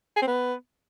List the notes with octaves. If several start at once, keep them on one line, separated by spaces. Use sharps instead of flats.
G#4
C4
B3